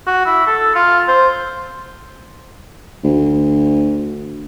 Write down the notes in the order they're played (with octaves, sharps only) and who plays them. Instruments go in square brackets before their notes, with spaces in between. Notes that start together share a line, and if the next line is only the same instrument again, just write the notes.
[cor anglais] F#4
E4
A4
F4
C5
[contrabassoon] D2